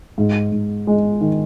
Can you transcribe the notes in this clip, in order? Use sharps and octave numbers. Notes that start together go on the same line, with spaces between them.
G#2
G#2
G#3
D#3